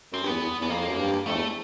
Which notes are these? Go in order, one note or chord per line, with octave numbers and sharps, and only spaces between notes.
F#2 C4
G2
E2 B3
E2
E2
B3
F2 A#3
F#2
G2
F2 A3
E2